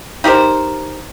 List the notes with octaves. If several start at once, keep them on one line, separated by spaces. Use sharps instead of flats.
D#4 G4 A#4 C5